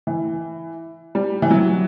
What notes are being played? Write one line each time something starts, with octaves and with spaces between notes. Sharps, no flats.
E3
G3
E3
F#3